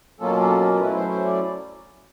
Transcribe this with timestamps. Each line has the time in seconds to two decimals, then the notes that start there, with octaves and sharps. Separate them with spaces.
0.20 B2 F#3 A#3 C#4 F4 A4
0.40 A4
0.60 A#4
0.73 A#4
0.79 F#3 A3 C#4 E4 B4
0.95 C5
1.10 C5
1.25 D5